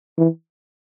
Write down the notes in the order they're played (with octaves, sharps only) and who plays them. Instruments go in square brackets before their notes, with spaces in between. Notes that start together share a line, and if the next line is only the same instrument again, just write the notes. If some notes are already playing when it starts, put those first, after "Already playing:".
[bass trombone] E3